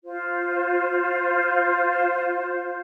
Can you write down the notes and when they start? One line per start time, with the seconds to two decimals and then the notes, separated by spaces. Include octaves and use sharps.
0.05 F4 C5